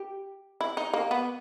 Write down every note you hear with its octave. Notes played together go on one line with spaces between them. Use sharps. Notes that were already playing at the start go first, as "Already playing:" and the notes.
Already playing: G4
E4
D#4
A#3
B3